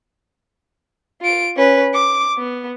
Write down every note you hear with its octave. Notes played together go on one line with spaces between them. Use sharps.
F4 D7
C#4 B4
D6
B3